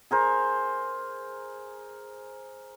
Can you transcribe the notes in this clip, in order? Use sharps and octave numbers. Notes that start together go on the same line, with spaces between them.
G#4 A#4 C5